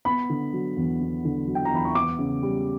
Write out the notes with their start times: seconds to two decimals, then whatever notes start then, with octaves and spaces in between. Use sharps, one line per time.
0.05 B3 B5
0.30 D3
0.53 F#3
0.77 E2
1.01 B3
1.25 D3
1.47 F#3
1.55 G5
1.65 A#5
1.72 E2 B5
1.85 C#6
1.95 B3 D6
2.19 C#3
2.43 G3